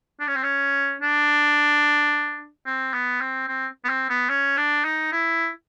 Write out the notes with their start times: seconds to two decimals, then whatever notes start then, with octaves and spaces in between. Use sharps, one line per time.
0.20 D4
0.28 C#4
0.35 C4
0.43 C#4
1.02 D4
2.66 C4
2.93 B3
3.21 C4
3.48 C4
3.85 B3
3.89 C4
4.09 B3
4.29 C#4
4.57 D4
4.84 D#4
5.12 E4